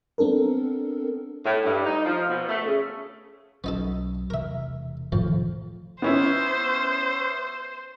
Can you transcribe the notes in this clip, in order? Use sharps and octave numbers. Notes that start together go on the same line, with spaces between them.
B3 C4 D4 A4 A#4
A2
G2
D#4
F3
B2
A3
C#3
B1 F#3 B3 C#4 D#4 A4
E1 C3 E3 A#4 E5
F2 A2 D#3 F3
B3 C#4 E4 C5